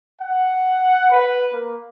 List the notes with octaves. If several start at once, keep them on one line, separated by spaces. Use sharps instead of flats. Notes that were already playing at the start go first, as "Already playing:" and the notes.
F#5
B4
A#3